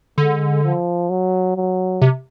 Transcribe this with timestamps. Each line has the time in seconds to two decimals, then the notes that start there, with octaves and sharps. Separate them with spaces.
0.18 D3 G#3
0.64 F3
1.10 F#3
1.56 F#3
2.02 C3